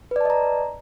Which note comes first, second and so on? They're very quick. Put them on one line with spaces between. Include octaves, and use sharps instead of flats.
B4 D5 A5 D#5 A#5